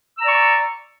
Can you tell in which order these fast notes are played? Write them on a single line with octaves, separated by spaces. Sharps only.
E6 A#5 D5 C#6